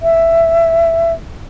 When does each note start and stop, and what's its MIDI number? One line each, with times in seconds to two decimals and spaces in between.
0.02 1.13 76